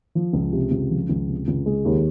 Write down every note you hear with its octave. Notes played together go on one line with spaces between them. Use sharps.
F3
C#2
C3
C#2
F3
C#2
C3
C#2
G#3
D#2